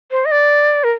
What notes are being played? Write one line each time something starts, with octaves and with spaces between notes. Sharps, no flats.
C5
D#5
D5
A#4